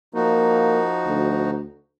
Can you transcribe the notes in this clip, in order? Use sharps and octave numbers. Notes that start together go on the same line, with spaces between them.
F3 A#3 D#4 F#4
D2